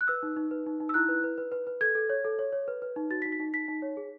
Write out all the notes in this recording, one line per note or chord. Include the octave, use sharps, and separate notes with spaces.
F#6
B4 E6
D#4
D#4
B4
D#4
D#4
E6
E4 F#6
B4
B4
B4
B4
B4
A4 G#6
A4
C#5
A4
C#5
C#5
B4
B4
D#4
F#4 A6
B6
D#4
B6
D#4
D#4 B6
D#4
C#5
G#4